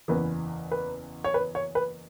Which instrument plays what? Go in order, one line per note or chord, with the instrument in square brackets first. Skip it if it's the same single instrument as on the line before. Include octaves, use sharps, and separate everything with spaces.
[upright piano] F#1 E2 E3 B4
B4
C#5
B4
C#5
B4